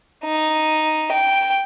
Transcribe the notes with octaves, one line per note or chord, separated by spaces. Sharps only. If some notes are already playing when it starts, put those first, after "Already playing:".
D#4
G5